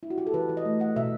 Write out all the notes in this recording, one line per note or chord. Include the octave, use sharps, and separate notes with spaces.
E4
F#4
G4
A4
E3 B4
E3
D#5
A3
A3 F#5
B2 E5